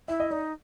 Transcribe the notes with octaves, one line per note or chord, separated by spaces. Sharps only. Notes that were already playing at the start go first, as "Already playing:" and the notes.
E4 E5
D#5
D#4 D5